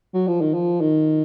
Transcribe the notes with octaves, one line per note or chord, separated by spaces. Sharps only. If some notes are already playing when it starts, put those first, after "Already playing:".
F#3
F3
D#3
F3
D#3